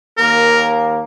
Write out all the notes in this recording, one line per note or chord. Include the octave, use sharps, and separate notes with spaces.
D#2 A#3 A#4